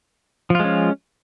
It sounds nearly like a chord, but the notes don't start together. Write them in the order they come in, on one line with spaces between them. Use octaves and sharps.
F3 F4 G#3 C#4